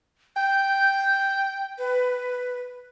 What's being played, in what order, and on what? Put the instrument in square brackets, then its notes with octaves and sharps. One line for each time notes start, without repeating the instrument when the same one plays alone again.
[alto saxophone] G5 [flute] G6
[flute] B4